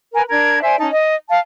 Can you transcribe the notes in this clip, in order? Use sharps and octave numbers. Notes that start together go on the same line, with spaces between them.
A#4 B4 G#5 A#5
D4 A#4 A#5 G#6
C5 D5 E5 G#5
C#4 D#4 A5
D#5
F5 A5